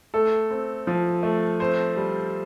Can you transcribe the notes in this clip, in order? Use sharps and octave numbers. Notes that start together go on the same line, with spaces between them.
A3 A4
C4
F3
A3
C4 C5
G3